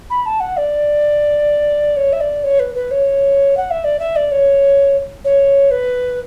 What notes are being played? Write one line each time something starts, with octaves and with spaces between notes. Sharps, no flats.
B5
A5
F#5
D5
C#5
E5
D5
C#5
B4
B4
C#5
F#5
E5
D5
E5
D5
C#5
C#5
B4